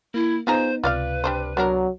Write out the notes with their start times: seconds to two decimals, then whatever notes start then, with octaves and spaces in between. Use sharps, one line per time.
0.14 A#3 E4
0.47 B3 D#4 F4 G#4 C5 A#5
0.84 C#2 C3 F4 B4 D5 F5
1.24 G3 D4 C5
1.57 F#3 B3 D4 A#4